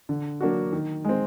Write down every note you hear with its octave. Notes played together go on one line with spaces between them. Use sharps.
D3
F#3 A#3 D4 F#4
D#3
G#3 C4